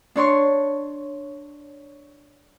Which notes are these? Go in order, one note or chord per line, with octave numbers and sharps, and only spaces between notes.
D4 C#5 C6 C#6